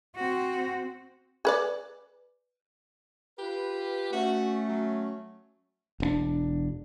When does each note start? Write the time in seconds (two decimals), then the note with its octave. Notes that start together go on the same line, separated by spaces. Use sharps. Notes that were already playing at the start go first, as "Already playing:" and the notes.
0.16 C4 F#4
1.45 G#4 B4 D5
3.39 F4 G4 B4
4.13 A3 C#4 F#4
4.69 F#3
6.00 E1 C4 D4